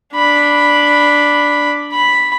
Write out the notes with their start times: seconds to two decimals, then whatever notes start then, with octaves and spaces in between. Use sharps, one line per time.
0.14 D4 B5
1.92 B5